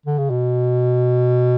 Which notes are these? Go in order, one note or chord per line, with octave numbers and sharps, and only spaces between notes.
D3
C#3
B2